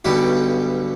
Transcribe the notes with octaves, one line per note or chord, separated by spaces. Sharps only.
B1 G2 B2 D3 G4